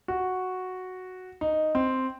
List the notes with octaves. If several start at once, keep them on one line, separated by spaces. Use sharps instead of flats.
F#4
D#4
C4